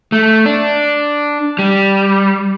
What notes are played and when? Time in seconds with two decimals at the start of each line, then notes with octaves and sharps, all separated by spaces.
0.12 A3
0.46 D4
1.59 G3